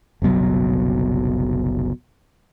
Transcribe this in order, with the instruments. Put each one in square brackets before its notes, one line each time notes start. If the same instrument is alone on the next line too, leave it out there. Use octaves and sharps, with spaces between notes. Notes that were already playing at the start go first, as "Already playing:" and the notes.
[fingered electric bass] F#1 C2 B2 F#3